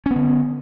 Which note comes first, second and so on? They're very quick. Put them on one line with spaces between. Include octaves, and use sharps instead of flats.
C#4 B3 D3